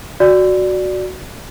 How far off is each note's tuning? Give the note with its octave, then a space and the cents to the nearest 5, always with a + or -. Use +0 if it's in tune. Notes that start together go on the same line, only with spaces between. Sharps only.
F#4 +0 D5 +0